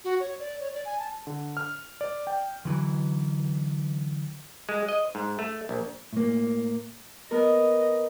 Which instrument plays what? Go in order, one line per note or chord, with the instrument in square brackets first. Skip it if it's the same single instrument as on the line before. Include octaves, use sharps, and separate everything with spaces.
[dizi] F#4
C#5
D5
C#5
D5
G#5
A5
[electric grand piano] D3
F6
D5
G5
[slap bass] D3 E3 F#3
[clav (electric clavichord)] G#3
D#5
G#2
A3
A#1
[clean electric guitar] A2 A#3
[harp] B3 A#4 [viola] D#5